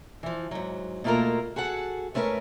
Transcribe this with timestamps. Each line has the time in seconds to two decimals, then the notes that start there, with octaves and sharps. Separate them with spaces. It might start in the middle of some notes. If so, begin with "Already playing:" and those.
0.23 E3 F3
0.51 G#2 F#3
1.04 B2 A3 A#3 F4 A4 A#4
1.56 F#4 G#4 A4 F#5
2.14 G#2 A3 C#4 D4 A#4 B4